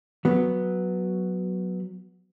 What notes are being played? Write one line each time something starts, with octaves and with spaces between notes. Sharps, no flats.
F#3 B3